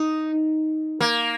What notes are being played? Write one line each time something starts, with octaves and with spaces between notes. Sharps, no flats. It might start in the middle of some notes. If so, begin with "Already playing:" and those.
Already playing: D#4
A#3